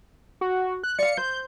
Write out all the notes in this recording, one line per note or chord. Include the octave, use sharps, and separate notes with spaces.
F#4
F#6
D5 F5 C#7
C5 G6